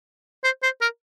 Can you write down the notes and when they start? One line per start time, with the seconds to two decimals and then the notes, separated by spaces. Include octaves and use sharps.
0.44 C5
0.63 C5
0.81 A#4